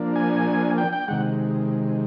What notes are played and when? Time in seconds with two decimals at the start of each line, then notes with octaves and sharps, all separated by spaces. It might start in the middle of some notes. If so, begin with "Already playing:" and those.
Already playing: F3 A#3 D4
0.16 G#5
0.78 G5
0.93 G5
1.08 C3 D#3 G#3 F#5